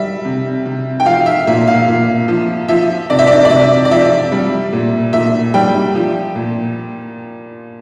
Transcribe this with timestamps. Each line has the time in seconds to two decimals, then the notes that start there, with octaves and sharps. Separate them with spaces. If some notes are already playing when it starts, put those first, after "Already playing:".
Already playing: G3 E5
0.25 C3
0.66 C3
1.00 G5
1.06 F3 F5
1.26 E5
1.47 A#2 E5
1.67 F5
1.88 A#2
2.28 F3
2.68 F3 E5
3.10 C3 D5
3.19 E5
3.27 D5
3.45 D5
3.50 C3 E5
3.85 D5
3.91 F3 E5
4.32 G3
4.73 A#2
5.13 A#2 E5
5.54 G3 G5
5.95 F3
6.35 A#2